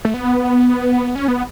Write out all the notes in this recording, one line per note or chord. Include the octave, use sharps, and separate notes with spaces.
A3
B3
C#4
B3